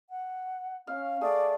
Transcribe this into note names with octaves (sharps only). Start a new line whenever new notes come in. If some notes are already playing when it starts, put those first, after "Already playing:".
F#5
C#4 F5
A3 G#4 D5